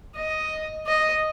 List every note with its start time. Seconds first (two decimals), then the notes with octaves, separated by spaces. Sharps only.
0.15 D#5
0.86 D#5